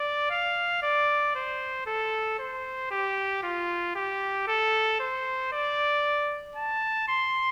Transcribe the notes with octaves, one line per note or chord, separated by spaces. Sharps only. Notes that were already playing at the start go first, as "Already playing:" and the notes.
Already playing: D5
F5
D5
C5
A4
C5
G4
F4
G4
A4
C5
D5
A5
C6